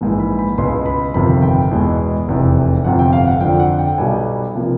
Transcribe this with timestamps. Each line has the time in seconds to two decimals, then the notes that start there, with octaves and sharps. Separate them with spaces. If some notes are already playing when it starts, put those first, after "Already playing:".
0.01 A#1 G#2 E3
0.19 B5
0.39 B5
0.58 C#2 B2 G#3 B3 C6
0.86 B5
1.14 G1 F2 C3 D#3 B5
1.42 G5
1.71 E2 B2 G#3 B3
2.28 F1 E2 C3
2.84 G1 F2 C3 F#5
2.99 G5
3.13 F5
3.27 F#5
3.41 F2 D3 F3 G5
3.60 F#5
3.79 G5
3.98 B1 B2 G3 B3 G#5
4.55 C3 F3 A#3